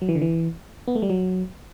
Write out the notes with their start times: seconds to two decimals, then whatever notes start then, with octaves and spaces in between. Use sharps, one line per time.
0.02 F#3
0.09 E3
0.15 D3
0.22 E3
0.88 B3
0.95 A3
1.02 G3
1.10 F#3